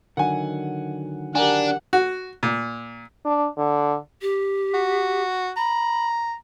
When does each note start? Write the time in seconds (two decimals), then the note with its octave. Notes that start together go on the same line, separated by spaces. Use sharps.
0.17 D3 D#3 F#3 F#5 G#5
1.35 D4 G4 A#4 F#5 G#5
1.93 F#4
2.43 A#2
3.25 D4
3.58 D3
4.22 G4
4.74 F#4
5.57 A#5 B5